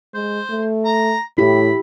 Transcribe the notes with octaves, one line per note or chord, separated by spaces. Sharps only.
G#3 C5
A3
A#5
A2 E4 G4 B5